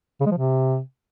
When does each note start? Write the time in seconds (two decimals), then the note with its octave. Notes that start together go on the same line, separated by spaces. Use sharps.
0.21 C#3
0.26 G#3
0.32 F3
0.37 C3